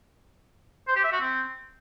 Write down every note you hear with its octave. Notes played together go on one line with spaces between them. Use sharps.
C5
G4
E5
F#4
C4